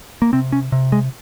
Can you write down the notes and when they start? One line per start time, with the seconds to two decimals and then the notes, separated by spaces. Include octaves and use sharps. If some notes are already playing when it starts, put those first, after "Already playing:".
0.22 A#3
0.33 C3 C4
0.52 C#4
0.72 C3
0.92 G#3